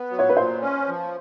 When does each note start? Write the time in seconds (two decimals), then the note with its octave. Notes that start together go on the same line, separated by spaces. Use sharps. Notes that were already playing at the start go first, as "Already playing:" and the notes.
Already playing: B3
0.11 F#3
0.19 C#5
0.29 B4
0.37 A#2 C5
0.62 C#4
0.88 F3